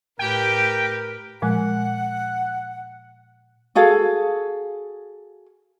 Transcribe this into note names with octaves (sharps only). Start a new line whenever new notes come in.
A2 G4 A#4 B4 G5
A#2 F3 G#3 F#5
F#4 G#4 A4 F5